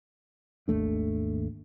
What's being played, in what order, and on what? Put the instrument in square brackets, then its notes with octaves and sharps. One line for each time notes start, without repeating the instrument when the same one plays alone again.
[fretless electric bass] G#1 D#2 A3 D4